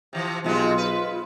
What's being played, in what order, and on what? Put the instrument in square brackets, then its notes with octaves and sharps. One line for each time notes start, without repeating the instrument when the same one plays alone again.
[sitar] C3 E3 F3
[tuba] B1 [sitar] C3 G#3 C4 [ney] F4
[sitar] B4